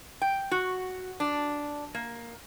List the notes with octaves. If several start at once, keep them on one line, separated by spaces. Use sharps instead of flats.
G5
F#4
D4
A#3